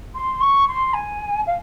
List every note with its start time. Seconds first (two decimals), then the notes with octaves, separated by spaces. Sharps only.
0.15 C6
0.41 C#6
0.68 C6
0.93 G#5
1.47 F5